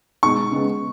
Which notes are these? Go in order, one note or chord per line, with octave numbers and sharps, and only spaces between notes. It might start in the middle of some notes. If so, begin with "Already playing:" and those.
B2 G#3 D#4 C#6
C#3 G#3 B3